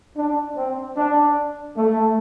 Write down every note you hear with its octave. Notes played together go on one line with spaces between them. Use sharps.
D4
C4
D4
A3